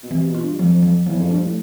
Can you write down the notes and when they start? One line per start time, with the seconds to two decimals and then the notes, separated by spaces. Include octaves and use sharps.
0.03 B2
0.11 C3 E3
0.27 B2
0.34 F4
0.42 G2
0.58 F2 F3
0.83 F3
1.06 E2 F3
1.19 F2
1.30 G2 F3
1.43 A2